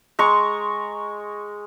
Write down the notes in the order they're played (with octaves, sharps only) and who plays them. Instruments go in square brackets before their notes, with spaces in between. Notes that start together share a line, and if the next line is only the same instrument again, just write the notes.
[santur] G#3 A#5 C#6